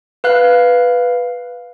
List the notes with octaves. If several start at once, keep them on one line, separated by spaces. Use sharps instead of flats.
B4 F5 F#6